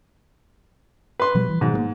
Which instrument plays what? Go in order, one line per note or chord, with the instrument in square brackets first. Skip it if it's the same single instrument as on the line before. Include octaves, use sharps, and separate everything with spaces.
[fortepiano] B4 C6
[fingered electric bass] B2 F3 G3
E3
[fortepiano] G#2 [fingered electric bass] B2 D#3 F#3
[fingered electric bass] G#3 A#3